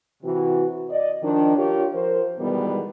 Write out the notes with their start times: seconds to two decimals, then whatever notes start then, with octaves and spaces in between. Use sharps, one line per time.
0.23 C3 E3 F#4
0.89 D5 D#5
1.23 D#3 F3 D4
1.57 F4 G4 A#4 C#5
1.94 F3 A#4 C5
2.39 B2 D#3 E3 G3 G#3 B3